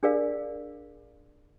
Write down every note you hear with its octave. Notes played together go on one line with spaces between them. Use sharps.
D4 G#4 A#4 D5 F5